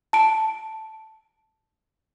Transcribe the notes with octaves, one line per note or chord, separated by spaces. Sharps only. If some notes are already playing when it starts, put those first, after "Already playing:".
A5 D7